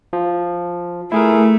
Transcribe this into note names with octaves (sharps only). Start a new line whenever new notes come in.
F3
A3 E4 G#4 A#4